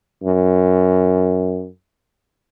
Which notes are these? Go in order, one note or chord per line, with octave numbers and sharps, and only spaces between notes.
F#2